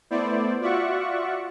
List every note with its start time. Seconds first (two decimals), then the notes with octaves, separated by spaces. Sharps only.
0.10 A3 B3 E4 C5 D5
0.61 F4 F#4 D5 E5 F#5 C#6